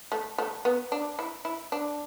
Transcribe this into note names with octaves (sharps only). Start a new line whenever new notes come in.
A3
A3
B3
D4
E4
E4
D4